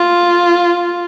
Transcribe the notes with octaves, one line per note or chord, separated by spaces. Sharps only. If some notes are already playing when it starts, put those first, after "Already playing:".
Already playing: F4